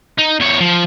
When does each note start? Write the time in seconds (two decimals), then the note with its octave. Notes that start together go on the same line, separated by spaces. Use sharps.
0.18 D#4
0.40 E2 C#5
0.61 F3